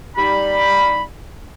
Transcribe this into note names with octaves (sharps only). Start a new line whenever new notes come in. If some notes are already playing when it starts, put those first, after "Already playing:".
G3 D#4 B5